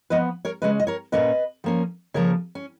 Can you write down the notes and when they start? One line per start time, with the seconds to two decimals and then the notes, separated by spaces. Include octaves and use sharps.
0.10 F3 B3 B4 D#5
0.45 A#4 C#5
0.62 C#3 G#3 C#4 B4 D#5
0.80 D#5
0.87 A#4 C#5
1.12 A#2 F3 A#3 C#4 B4 D#5
1.64 F3 A#3 C#4
2.14 C#3 F3 A#3 A#4 C#5
2.55 C#4